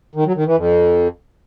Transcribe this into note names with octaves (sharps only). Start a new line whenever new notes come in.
D#3
F#3
D#3
E3
F2